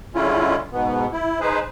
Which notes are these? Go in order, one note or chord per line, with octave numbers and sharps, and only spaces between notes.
D3 G3 G#3 C#4 E4 F4
G#2 B2 B3
E4
D#4 G#4 B4 C5